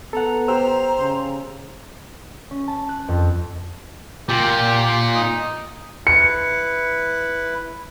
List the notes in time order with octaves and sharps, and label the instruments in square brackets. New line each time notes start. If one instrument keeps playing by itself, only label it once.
[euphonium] B3 [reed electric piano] A4 F#5 [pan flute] A#5
[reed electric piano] G4 G5 E6 [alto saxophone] C5
[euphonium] C#3
[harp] C#4
A5
F#6
F2
[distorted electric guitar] A#2 [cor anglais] G4
[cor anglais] D#4
[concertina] E4 B4 [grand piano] C#7